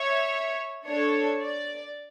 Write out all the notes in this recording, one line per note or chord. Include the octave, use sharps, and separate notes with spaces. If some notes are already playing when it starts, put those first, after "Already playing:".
Already playing: C#5 E5
D4 A4 C#5
D5